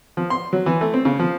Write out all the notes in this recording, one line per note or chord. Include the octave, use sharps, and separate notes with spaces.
F3
C6
F#3
E3
A3
C4
C#3
F3